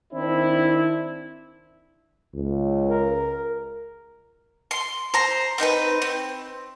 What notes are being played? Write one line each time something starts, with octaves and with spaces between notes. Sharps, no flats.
D#3 C4 D4 E4
C#2
A#4
C6
C5 A#5
C4 D#4 A#4 B4
C4